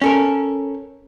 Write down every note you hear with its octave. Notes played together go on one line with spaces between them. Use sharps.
C#4 A4 A#4